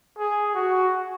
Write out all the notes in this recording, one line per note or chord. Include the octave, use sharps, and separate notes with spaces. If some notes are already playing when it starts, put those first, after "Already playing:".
G#4
F#4